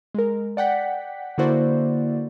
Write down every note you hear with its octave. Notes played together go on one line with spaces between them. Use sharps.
G#3 A#4
D5 F#5 G5 B6
D3 A#3 E4 F#4 C5 D5